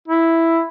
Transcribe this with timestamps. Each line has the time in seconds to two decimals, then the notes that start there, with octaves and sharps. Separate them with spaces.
0.08 E4